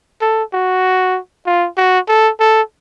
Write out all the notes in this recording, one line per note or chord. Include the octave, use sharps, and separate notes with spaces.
A4
F#4
F4
F#4
A4
A4